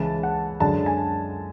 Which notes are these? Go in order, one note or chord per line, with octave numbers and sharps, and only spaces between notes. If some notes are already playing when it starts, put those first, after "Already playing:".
Already playing: C#2 C#3 E3 G#3 A5
F#5
F#2 D3 G#3 A5
G#5